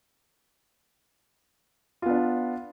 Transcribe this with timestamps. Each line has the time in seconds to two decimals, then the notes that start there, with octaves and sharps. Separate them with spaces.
2.02 F4
2.06 B3
2.09 D4